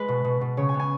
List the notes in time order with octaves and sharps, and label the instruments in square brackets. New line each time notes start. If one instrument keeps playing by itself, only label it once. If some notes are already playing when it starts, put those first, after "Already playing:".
Already playing: [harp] G#3 B4
B2
B2
B2
C#3 C#5
G#5
B3
G#5